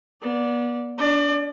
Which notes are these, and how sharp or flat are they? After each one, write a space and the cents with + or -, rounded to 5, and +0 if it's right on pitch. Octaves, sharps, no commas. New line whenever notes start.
B3 -35 D5 -10
D4 -30 D5 +35